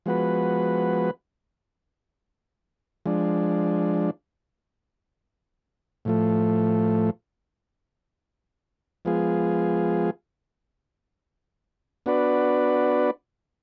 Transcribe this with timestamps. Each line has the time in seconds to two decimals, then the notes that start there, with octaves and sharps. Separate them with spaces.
0.06 F3 G#3 B3 F#4 B4
3.06 F3 G#3 D4
6.05 A2 F3 A3
9.05 F3 G#3 B3 F4 G#4
12.06 B3 D4 F#4 B4 D5